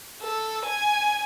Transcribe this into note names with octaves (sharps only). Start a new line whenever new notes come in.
A4
G#5